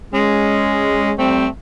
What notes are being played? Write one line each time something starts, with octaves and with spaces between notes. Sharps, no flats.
G#3 C#4
G3 A3 C4